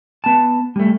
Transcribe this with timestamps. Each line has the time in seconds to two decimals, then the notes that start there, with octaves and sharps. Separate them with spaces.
0.24 B3 A5
0.76 G3 A3